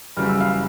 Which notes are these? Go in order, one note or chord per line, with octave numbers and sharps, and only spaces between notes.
F#1 F#2 C#3 E3 G3 F6
E6
F5 F6